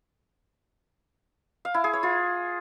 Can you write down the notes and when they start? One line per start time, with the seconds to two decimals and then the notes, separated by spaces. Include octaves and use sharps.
1.65 F5
1.74 E4
1.84 G#4
1.93 C#5
2.03 F4